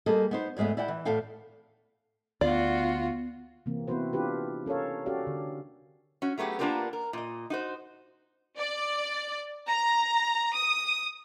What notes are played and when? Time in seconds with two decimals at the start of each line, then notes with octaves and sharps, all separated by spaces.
0.06 G3 A#3 G#4 A4 D#5
0.31 B3 D#4 C5
0.57 E2 G#2 G#3 A3 B3
0.77 E4 D5 F#5 G5
0.88 E3
1.05 E2 A2 B3 A4 F5 G5
2.41 D2 B3 F4 F#4 D5
3.66 C3 E3 A#3 C4
3.88 B3 C4 E4 F#4 B4 C5
4.13 D4 F4 G4 B4
4.66 C#4 A4 A#4 C#5 F5
5.06 C#4 F#4 G4 A4 D5 F5
5.27 D3
6.22 C#4 F#4
6.38 F#3 A3 B3 G4 G#4
6.59 A#3 B3 D4 F4 G4 A#4
6.93 A#4
7.13 A#2 D#5
7.50 D#4 F#4 C5
8.58 D5
9.70 A#5
10.55 D#6